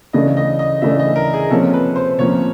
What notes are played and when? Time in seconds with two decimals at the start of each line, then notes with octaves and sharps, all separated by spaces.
0.13 C#3 E3 A3 D4 D#5
0.37 D#5
0.59 D#5
0.82 C#3 E3 A3 D4 E5
0.99 D#5
1.16 A#4
1.34 G#4
1.50 C3 F3 A#3 C#4 A4
1.73 B4
1.96 C5
2.18 C3 F3 A#3 C#4 C#5